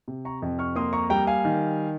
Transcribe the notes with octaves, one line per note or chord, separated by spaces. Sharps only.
C3
A#5 C#6
F2
C#6 F6
A#3 C6 D#6
A#5 C#6
G3 G5 A#5
F5 G#5
D#3